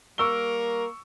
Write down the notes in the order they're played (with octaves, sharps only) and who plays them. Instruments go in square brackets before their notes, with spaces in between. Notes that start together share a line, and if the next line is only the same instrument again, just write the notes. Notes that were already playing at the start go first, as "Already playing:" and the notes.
[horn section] G3 A#3 A#4 [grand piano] C#6 E6 G7